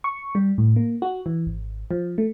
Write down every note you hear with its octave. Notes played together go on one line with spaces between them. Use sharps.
C#6
G3
A2
A#3
F#4
E3
G#1
F3
A3